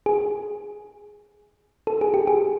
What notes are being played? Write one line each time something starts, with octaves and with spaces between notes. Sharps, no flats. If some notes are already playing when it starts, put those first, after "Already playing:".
G#4
A4
G#4
G4
G#4